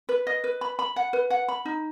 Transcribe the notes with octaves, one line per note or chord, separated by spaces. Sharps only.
B4
D#5
B4
B5
B5
F#5
B4
F#5
B5
D#4